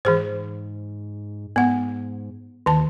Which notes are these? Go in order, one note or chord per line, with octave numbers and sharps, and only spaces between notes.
G#2 E3 G#4 C5
G#2 B3 F#5
D#2 D#3 A5